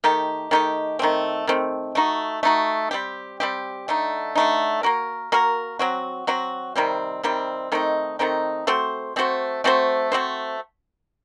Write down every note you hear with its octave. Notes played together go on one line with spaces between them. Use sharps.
D#3 A3 D#4 G4
D#3 A3 D#4 G4
D#3 A3 C4
D#3 A3 C4
A3 D#4 F#4
A3 D#4 F#4
G3 C4 G4
G3 C4 G4
D3 A3 D#4
D3 A3 D#4
A#3 F#4 A#4
A#3 F#4 A#4
F#3 C4 F#4
F#3 C4 F#4
C3 D#3 G3 C4
C3 D#3 G3 C4
D#3 A3 C4 D#4
D#3 A3 C4 D#4
A3 C4 F#4 C5
A3 C4 F#4 C5
A3 C4 F#4 C5
A3 C4 F#4 C5